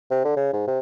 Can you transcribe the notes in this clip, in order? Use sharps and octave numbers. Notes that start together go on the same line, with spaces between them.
C3
D3
C#3
G#2
C3